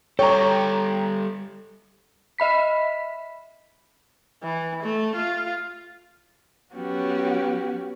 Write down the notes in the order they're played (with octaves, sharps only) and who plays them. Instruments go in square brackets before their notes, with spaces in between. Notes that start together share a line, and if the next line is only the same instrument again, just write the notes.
[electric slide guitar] G3 A4 [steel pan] C#5 [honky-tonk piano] G5 A#5
[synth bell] D#5 E5 B5 B6
[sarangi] E3
A3
F4
[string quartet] F#3 B3 C#4 F#4 G4